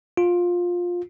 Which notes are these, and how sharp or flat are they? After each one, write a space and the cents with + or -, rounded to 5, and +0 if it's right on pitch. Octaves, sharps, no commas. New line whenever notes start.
F4 +15